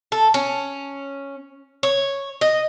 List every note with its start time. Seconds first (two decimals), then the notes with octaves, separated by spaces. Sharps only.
0.12 A4
0.34 C#4
1.83 C#5
2.41 D#5